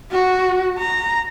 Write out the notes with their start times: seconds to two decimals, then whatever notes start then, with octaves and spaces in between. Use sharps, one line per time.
0.12 F#4
0.78 A#5